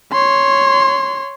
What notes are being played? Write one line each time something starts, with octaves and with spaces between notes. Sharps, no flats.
C#5 C6